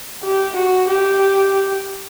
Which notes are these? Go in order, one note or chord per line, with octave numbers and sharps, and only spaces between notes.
G4
F#4
G4